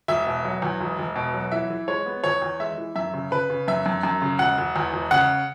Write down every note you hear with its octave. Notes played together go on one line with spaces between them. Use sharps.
E1 E5
B2
F#3
E2
E1
E1
B2
F#3
E3 E5
E3
G#3 C#5
B3
E2 C#5
E2
G#3 E5
E3
F#2 E5
C#3
C#3 B4
C#3
F#2 E5
F#2
F#2
C#3
E1 F#5
E1
E2
E1
C#3 F#5